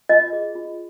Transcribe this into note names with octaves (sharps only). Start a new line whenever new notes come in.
F4 D#5
G#4
F4